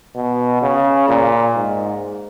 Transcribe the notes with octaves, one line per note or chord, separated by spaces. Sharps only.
B2
C#3
A#2
G#2